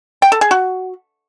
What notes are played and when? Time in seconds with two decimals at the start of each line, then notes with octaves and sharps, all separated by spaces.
0.22 G5
0.32 A4
0.41 G#4
0.51 F#4